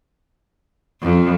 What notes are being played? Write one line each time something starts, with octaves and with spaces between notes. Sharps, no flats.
F2